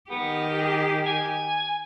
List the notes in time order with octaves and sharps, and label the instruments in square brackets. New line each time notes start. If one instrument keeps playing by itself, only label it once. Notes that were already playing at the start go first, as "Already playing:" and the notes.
[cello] D#3 G4 [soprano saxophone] B3
[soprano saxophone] G#4
G#5